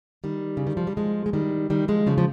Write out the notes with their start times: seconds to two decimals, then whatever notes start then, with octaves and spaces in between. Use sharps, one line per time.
0.24 D#3 G3
0.57 C#3
0.67 D#3
0.77 F3
0.87 G3
0.97 F3 G#3
1.26 G#3
1.33 D#3 G3
1.70 D#3 G3
1.88 F3 G#3
2.07 C#3 F3
2.18 F3